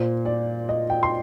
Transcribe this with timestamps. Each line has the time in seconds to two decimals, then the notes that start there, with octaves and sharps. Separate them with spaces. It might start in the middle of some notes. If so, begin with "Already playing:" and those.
Already playing: A#2 C5
0.25 D5
0.69 D#5
0.90 G5
1.03 C6